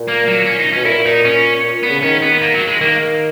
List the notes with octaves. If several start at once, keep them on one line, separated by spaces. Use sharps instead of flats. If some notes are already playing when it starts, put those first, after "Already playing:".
Already playing: A#2
A#3
F#3
C#4
D#4
B2 C#4
A#2 E4
D#4
C#4
A#2
B3
C#3
D#3 C#4
B3
A#3
F#3
G#3
D#3 A#3